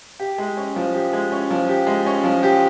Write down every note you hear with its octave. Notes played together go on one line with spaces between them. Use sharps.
G4
G#3
C#4
F3
G4
G#3
C#4
F3
G4
G#3
C#4
F3
G4